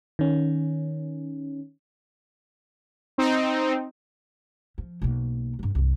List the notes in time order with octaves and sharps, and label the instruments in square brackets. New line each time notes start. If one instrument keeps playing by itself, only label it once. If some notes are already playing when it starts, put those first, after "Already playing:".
[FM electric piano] D#3 C#4
[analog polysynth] C4 D#4
[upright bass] F3
B1 A#3
G2 G3
C2 G2